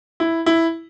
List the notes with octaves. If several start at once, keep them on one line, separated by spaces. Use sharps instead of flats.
E4
E4